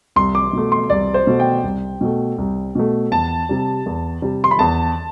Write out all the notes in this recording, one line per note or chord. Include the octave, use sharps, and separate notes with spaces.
C2 C6
D6
B2 A3
C6
C2 D5
C5
B2 A3
G5
C2
B2 A3
C2
B2 A3
E2 A5
C3 G3
E2
C3 G3
C6
B5
E2 A5